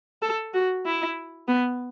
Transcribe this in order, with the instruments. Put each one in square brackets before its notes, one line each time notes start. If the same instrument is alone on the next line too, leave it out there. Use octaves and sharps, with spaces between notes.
[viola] A4
F#4
E4
B3